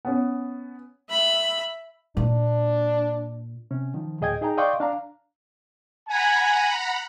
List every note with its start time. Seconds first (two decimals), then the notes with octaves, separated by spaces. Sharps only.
0.05 B3 C#4
1.10 E5 B5
2.17 A#2 D4
3.71 C3 C#4
3.94 D#3 F3
4.21 D2 A2 G#4 D#5 G5 G#6
4.41 D#4 G#4 D#5 G5 A#5
4.57 D5 D#5 F5 G5 C6 C#6
4.80 D4 F5 A#5
6.08 F#5 G#5 A#5 B5